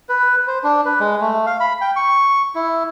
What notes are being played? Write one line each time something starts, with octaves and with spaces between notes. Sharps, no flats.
B4
C5
D4
B4
G#3
A3
F5
B5
G5
C#6
E4